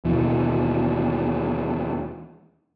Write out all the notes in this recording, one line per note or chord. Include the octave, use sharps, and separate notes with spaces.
D#2 B2 E3